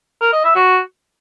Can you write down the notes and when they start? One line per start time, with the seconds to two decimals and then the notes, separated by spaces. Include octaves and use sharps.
0.21 A#4
0.33 D#5
0.44 E5
0.56 F#4